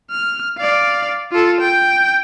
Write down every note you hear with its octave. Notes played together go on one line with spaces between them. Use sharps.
F6
D5 F5
F4 A4
G5